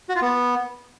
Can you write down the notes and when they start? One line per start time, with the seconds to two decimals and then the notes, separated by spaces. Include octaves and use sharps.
0.09 F#4
0.15 F4
0.22 B3